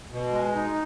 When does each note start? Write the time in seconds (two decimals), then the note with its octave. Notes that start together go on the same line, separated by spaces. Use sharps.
0.12 B2
0.33 G#3
0.55 D#4